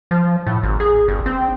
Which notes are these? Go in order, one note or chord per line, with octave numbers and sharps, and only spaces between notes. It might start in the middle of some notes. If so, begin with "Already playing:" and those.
F3
A2
G#1
G#4
G1
C4